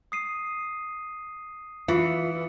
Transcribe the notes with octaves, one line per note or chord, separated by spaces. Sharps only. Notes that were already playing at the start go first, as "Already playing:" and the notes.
D#6 C7 D#7
E3 F4 C#7